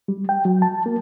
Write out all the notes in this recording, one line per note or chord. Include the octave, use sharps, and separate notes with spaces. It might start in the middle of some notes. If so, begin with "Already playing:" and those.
G3
G5
F#3
A5
A#3